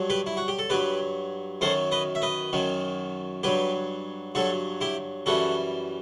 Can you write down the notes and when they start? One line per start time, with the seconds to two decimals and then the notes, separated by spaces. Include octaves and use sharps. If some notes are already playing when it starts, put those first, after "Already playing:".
Already playing: G2 F#3
0.10 G4 B4
0.26 E4
0.37 F#4
0.48 G4
0.59 A4
0.70 G2 F#3 G4 B4
1.61 F#2 D#3 F#3 A4 C5
1.92 B4 D#5
2.15 E5
2.22 B4 D#5
2.53 F#2 D#3 F#3
3.43 G2 F#3 G4 B4
4.35 G2 F#3 F#4 A4
4.81 E4 G4
5.26 F#2 E3 G3 F#4 A4